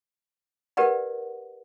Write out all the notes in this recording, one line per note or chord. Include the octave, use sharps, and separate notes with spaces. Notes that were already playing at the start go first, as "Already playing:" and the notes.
G4 A#4 B4 D5 F#5